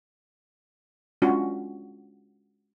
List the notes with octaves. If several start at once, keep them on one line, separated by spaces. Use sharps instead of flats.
G#3 C#4 D4 F4 F#4